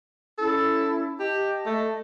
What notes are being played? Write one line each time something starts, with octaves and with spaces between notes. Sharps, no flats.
C#4 E4 A4
G4 D#5 A5
A3